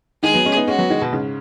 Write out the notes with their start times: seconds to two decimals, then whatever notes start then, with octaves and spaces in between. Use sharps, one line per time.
0.23 D#3 G#3 G#4
0.34 F#3 B3
0.45 G#3 C#4
0.56 B3 D#4
0.67 G#3 C#4 F#4
0.79 F#3 B3
0.90 D#3 G#3
1.02 B2
1.13 G#2 C#3